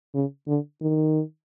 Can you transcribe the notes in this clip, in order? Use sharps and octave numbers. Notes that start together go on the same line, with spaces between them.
C#3
D3
D#3